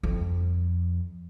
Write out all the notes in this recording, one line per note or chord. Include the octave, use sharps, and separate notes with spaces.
F2